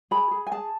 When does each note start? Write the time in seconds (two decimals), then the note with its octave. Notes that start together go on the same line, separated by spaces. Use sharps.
0.11 G#4 B5
0.31 G#4
0.47 G#5
0.52 G#4 A5